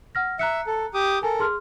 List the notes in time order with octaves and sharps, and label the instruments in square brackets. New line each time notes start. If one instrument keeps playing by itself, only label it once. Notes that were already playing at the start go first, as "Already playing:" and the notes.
[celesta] F#5 F6 A#6
[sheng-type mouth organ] E5 [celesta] A#5 F#6 C#7
[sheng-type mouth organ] A4
G4 D6 D#6
[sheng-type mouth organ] A4 A#4 [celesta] G#5
[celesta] G#4 C6 F6